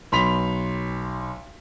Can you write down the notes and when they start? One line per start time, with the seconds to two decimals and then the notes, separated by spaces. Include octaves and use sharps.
0.12 B1 B5 C6 B6 F7